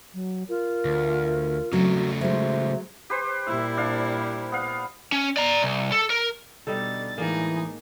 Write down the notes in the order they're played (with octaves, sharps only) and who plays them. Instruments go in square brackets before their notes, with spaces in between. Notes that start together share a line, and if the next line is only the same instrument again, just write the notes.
[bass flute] F#3
[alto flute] F4 [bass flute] A#4
[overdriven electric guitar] D2
[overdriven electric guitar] C#3 A3 [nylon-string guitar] F#3 [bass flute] C4
[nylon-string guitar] F#3 G#3 [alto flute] C5 [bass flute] E5
[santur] G4 B4 C5
[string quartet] A#2 G3 E4 [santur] E5
[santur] D4 F5
B3 F5
[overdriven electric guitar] C#4
D5 A#5
C2
A4
A#4
[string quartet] B2 D3 A6 [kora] G3 D#4 A4
[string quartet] A2 G#3 [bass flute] E3 [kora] A#3 [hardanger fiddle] D#4 G#4